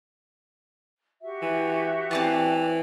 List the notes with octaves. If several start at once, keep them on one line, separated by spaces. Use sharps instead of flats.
F#4 G4 E5
E3
E3 C4 D5 A5